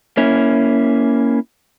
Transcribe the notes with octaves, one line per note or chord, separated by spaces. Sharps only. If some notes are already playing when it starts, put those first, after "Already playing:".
A#3 C#4 E4